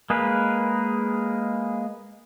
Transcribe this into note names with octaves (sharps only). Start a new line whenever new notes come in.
G#3 A#3 G#4 A#4 B4